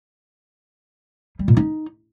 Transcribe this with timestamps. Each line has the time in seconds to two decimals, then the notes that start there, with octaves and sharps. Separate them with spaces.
1.39 G3
1.48 A#2
1.57 D#4